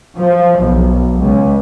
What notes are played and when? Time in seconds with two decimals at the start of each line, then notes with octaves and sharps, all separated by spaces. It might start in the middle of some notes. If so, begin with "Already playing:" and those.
0.18 F3
0.61 B1
1.20 C#2